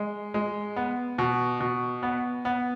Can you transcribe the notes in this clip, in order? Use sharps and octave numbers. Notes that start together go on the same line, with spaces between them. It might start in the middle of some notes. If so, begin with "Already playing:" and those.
Already playing: G#3
G#3
B3
B2
B2
B3
B3